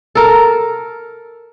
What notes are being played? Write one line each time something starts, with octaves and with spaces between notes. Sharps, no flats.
A4 A#4